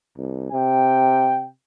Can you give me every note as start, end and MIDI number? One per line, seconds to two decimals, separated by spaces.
0.17 0.50 36
0.52 1.50 48
0.52 1.46 79